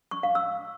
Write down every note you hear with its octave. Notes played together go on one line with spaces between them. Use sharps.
C#6
F5
E6